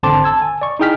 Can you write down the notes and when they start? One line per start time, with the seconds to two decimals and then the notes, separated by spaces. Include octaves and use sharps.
0.03 G#1 D3 C4 A5 C6 D6
0.24 A5 E6 G#6
0.42 G#5
0.61 D5 C#6
0.79 D#4 E4 G#4 G5 F6 B6